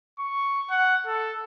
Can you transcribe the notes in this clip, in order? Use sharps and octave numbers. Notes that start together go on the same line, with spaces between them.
C#6
F#5
A4